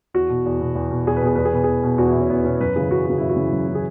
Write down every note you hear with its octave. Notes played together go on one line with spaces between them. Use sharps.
E2 F#4
B2
E2
B2
E2
B2
E2 G#4
B4
B2 G#4
E2 B4
G#4
B2 B4
E2 G#4
B2
E2 F#4
E4
B2
C#4
E2 B3
B2 C#4
F#2 B4
C#3 E3 G#4
F#2 F#4
C#3 E3 F#4
F#2 E4
F#4
C#3 E3
F#2
C#3 E3
G#4